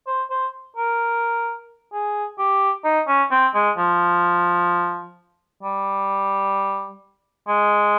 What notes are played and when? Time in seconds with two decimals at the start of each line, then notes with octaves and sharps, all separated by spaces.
0.07 C5
0.30 C5
0.76 A#4
1.93 G#4
2.38 G4
2.84 D#4
3.08 C#4
3.31 C4
3.54 G#3
3.78 F3
5.63 G3
7.48 G#3